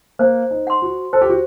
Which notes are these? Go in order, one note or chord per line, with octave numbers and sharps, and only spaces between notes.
A#3 C5
D#4
F#5 C6
F#4
A4 C5
G4
F#4